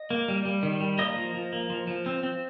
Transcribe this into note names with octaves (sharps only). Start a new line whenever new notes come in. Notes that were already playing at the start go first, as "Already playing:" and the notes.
Already playing: D#5
A#3
G3
G3
D#3
G3
A#3 D#5 D#6
F3
F3
A#3
F3
F3
C4
C4